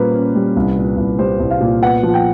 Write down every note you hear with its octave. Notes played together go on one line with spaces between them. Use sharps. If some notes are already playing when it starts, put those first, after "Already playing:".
Already playing: A#2 G3 A#3 C#4 B4 C5
C#4
G3
C2
A#2
C2
G3 C5
C2
F5
A#2
B3 F#5
F3
G5